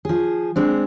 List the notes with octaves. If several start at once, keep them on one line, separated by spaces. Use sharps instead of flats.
F3 G#4
G#3 C4 D4